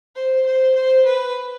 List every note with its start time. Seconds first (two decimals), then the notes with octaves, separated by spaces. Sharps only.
0.15 C5
0.45 C5
0.75 C5
1.05 B4